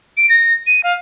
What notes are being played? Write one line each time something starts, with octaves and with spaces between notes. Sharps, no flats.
D7
A#6
D#7
F5